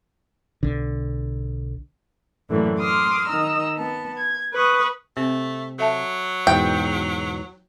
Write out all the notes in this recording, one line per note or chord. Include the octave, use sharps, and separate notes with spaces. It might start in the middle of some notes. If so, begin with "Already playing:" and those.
B1 D3
F#2 A2 D3 E3 A#3
C6 D6 D#6 F6
D#3 D#5 A#5 E6
B3 A5
G#6
B4 C#6 D#6
C3 A3 C4
F#3 A4 E5 A5
E2 G#2 B2 G5